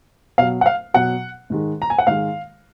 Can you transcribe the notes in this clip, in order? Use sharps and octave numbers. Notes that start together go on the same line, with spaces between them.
B2 F#3 F5
F#5
F5
B2 F#3 F#5
G#2 D#3 G#3
A#5
G#5
F#5
G#2 D#3 G#3 F5